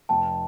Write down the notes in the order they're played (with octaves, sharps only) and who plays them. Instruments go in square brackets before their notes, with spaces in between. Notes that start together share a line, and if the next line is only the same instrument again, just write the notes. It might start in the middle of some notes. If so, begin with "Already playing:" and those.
[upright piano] F1 [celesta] G5 A5